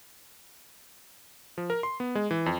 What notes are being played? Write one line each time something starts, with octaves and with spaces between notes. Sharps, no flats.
F3
A#4
C6
B3
G#3
E3
F2